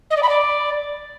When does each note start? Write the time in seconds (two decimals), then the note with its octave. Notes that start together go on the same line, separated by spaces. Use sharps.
0.10 D#5
0.17 D5
0.23 B5
0.29 D5